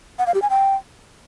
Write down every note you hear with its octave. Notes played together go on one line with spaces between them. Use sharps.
F#5
F5
G4
G#5
G5